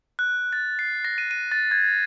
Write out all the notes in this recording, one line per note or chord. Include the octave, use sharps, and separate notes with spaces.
F#6
A6
C7
A#6
D#7
D#7
A6
G#6